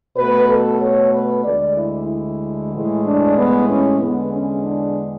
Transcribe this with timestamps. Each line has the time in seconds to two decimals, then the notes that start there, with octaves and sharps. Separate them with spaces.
0.17 B2 A3 B4
0.49 A4
0.81 C#5
1.13 B4
1.44 D2 D3 G#3 D5
1.77 E4
2.08 E4
2.72 A2 E3 G#3
3.04 D4
3.36 B3
3.68 C#4
4.00 E2 D3 G#3 B3
4.31 C#4
4.63 D4